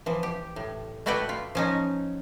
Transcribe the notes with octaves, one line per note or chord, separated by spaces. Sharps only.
E3 F3
G4
A2
A3 E4 F#4 B4 D5 G5
F4
F3 C#4 D#4